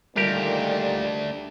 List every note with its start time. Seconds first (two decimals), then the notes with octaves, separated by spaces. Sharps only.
0.16 A#2 D#3 G3 A3 D4 G4 A#4